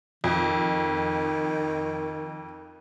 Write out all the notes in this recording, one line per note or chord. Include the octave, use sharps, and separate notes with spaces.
F2 D#3